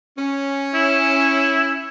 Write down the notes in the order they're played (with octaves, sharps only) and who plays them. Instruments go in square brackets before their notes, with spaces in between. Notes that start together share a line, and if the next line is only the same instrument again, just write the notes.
[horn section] C#4
[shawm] E4